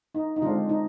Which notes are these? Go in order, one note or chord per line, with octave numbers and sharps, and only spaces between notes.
D#4
D#4
D3 G#3 C4 D4 F4
D#4